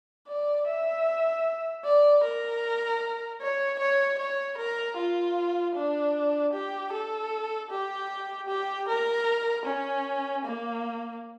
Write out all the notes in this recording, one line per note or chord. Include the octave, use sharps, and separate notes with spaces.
D5
E5
D5
A#4
C#5
C#5
C#5
A#4
F4
D4
G4
A4
G4
G4
A#4
C#4
A#3